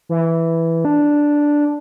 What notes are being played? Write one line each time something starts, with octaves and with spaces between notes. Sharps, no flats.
E3
D4